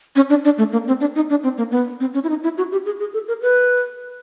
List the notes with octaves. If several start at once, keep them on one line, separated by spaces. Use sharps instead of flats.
C#4
D4
D4
A3
A#3
C4
D4
D#4
D4
C4
A#3
B3
C4
C#4
E4
D#4
E4
F#4
G4
G#4
G#4
A4
A#4
B4